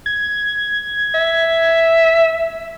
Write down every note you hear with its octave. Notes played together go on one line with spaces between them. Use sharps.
G#6
E5